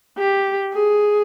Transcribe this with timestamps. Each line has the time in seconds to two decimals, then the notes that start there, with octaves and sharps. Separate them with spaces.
0.18 G4
0.74 G#4